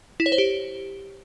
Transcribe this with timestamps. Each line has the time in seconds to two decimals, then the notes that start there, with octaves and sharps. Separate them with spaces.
0.20 E4
0.26 C#5
0.32 C5
0.38 G4